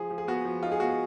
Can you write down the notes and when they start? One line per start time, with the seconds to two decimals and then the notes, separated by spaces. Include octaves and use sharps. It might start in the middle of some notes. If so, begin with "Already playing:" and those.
Already playing: F3 G#4
0.11 F3
0.18 G#4
0.28 B3 F#4
0.45 F3
0.63 D#4 F4
0.72 G#4
0.80 B3 F#4